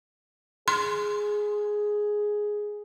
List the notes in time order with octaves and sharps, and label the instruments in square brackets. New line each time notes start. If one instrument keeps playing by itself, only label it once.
[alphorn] G#4 [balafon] C6